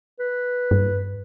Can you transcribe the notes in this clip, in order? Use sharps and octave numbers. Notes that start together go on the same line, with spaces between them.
B4
G2